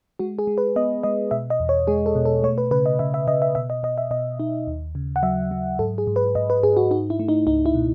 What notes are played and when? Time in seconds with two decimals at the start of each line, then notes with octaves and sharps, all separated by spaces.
0.19 G#3 F#4
0.39 G#4
0.47 G#3
0.58 B4
0.76 B3 D#5
1.03 G#3 D#5
1.31 B2 E5
1.50 D#5
1.60 E2
1.69 C#5
1.87 G#3 G#4
2.06 A4
2.15 B2
2.25 A4
2.43 A3 C#5
2.58 B4
2.71 C#3 B4
2.86 D#5
2.99 C#3 E5
3.14 E5
3.27 C#3 D#5
3.42 E5
3.55 B2 E5
3.70 D#5
3.83 B2 D#5
3.98 E5
4.11 B2 D#5
4.40 D#4
4.67 D#2
4.95 C#3
5.16 F#5
5.23 F#3 E5
5.51 F#3
5.79 G#2 A4
5.98 G#4
6.07 G#2
6.16 B4
6.35 G#2 D#5
6.50 B4
6.63 G#2 G#4
6.77 F#4
6.91 D#4 F#4
7.10 E4
7.19 A3
7.28 D#4
7.47 C#2 D#4
7.66 E4
7.75 B2